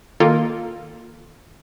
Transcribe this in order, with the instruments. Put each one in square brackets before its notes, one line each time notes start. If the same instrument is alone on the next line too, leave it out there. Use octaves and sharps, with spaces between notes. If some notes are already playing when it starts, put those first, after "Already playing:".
[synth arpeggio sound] D#3 A#3 F4 A4 A#4